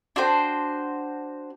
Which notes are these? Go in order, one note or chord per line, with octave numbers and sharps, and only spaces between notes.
D4 F#4 C5 G5